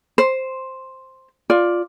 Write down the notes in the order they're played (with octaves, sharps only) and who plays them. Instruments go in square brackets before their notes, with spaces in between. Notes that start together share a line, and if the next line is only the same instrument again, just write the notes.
[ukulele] C5
F4 D5